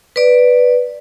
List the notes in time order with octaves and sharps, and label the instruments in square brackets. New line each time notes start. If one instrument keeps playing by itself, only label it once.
[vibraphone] B4 D5